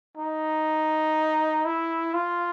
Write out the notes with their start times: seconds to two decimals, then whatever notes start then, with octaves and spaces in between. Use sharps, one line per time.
0.18 D#4
1.66 E4
2.14 F4